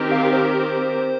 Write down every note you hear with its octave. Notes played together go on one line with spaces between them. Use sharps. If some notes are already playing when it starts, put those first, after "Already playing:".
Already playing: D#3 C4 G4 A#4
F5
C5